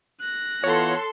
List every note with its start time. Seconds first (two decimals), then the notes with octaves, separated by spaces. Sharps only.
0.20 F#6 A#6
0.64 E3 B3 F4 A4 C#5 C6